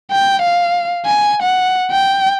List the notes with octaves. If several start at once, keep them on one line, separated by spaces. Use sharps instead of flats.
G5
F5
G#5
F#5
G5